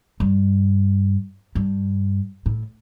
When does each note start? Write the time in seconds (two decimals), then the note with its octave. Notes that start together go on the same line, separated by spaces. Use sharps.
0.20 G2
1.55 G2
2.46 A2